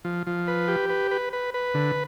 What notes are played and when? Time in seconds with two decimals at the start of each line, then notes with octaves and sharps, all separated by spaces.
0.05 F3
0.27 F3
0.47 B4
0.68 G4
0.90 B4
1.11 B4
1.33 B4
1.54 B4
1.74 D3